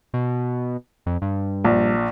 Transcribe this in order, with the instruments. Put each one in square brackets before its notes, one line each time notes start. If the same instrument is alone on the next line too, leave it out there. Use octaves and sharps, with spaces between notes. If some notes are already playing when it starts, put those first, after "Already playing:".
[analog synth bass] B2
F2
G2
[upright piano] A#1